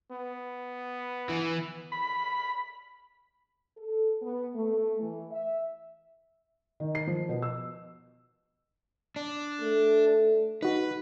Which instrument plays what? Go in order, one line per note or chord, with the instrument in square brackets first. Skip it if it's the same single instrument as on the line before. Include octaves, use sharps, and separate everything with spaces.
[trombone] B3
[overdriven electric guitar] E3
[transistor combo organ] B5
[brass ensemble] A4
B3
A3
E3
E5
[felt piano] D#3
C7
F3
B2
E6
[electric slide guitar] D4
[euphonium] A3
[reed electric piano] D#4 F#4 [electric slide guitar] B4